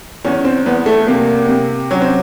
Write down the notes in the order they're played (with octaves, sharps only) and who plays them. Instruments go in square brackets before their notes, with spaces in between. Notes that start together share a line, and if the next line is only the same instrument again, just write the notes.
[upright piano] E2 [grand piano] C#4
[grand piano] C4
[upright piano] E2 [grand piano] B3
[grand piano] A3
[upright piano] C3 [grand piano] A#3
[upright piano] C3
[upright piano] F#3 [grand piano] C#4
[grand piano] C4